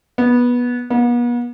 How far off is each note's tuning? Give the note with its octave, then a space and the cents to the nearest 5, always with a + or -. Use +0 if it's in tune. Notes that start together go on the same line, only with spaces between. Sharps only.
B3 -15
B3 -40